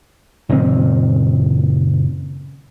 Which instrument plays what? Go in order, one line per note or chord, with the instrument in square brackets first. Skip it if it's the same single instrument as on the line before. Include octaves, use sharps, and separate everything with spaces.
[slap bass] F#1 A#2 D#3 C4